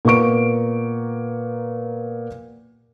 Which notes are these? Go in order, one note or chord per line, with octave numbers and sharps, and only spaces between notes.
A#2 B3 A#4 C#6 D7